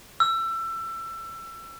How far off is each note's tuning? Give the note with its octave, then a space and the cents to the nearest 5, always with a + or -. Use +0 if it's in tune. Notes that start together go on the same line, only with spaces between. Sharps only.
E6 +25